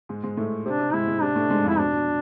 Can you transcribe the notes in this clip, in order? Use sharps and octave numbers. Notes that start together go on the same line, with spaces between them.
G#2 G#3
G#2 G#3
A2 A3
C3 C4 D4
C3 C4
G#2 G#3 E4
G#2 G#3
C3 C4 D4
A2 A3
G#2 G#3
F2 F3 E4
B2 D4
B2